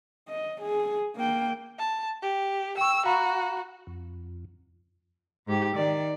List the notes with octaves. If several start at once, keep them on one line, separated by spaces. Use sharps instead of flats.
D#5
G#4
A#3 G5
A5
G4
G5 C#6 E6
F#4 F5 A#5 B5
F2
G#2 G4
D#3 D5